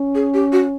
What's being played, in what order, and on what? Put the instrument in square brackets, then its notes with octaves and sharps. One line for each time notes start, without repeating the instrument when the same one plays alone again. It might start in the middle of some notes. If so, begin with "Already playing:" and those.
Already playing: [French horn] C#4
[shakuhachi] G#4
G4
F#4